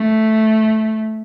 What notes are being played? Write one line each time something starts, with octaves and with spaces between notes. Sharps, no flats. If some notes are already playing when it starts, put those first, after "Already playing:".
Already playing: A3